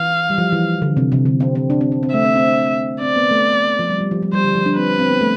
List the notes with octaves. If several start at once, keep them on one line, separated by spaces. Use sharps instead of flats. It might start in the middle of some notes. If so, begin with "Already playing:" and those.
Already playing: E3 F5
G3
F3
E3
D3
C3
C3
D3
C4
C4
D4
C4
C4
C4
A3 E5
C4
C4
D4
C4 D5
B3
A3
F3
G3
G3
F3
G3
G3 C5
D3
F3
D4
C4 B4
C4
B3
A3